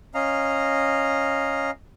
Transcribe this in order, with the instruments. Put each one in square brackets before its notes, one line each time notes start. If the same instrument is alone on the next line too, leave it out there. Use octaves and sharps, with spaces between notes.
[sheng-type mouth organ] C#4 D#5 F5 A#5